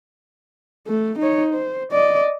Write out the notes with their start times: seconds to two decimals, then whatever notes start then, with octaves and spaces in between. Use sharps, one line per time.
0.87 A3
1.19 D#4 C#5
1.54 C5
1.92 D5 D#5